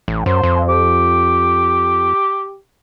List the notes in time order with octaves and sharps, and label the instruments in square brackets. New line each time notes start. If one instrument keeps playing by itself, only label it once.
[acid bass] A1
[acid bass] F#2 [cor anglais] C5
[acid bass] F2
[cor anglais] G4